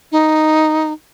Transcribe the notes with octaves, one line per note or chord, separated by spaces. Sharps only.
D#4